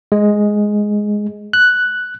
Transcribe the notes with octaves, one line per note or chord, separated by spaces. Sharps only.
G#3
F#6